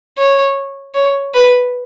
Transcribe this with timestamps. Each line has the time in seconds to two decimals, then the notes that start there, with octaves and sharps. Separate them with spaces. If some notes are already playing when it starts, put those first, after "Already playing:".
0.18 C#5
0.95 C#5
1.34 B4